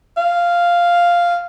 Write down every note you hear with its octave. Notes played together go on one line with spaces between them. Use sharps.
F5